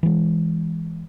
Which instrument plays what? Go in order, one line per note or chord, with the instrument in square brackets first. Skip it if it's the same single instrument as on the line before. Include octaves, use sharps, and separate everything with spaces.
[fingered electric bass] E3 G#3